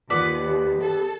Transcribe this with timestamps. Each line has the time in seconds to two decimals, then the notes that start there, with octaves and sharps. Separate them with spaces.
0.10 D#2 B3 F4 B4 D5
0.42 G4
0.82 G4 A4